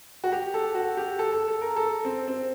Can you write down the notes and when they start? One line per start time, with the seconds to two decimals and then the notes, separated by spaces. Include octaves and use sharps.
0.24 F#4
0.32 G4
0.54 A4
0.75 F#4
0.97 G4
1.19 A4
1.33 A4
1.48 A4
1.61 A#4
1.76 A4
2.05 C4
2.28 C4